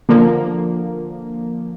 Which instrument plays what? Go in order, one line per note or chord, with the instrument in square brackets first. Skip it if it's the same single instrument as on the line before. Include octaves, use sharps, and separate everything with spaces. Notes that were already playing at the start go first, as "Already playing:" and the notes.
[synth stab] D3 F3 A#3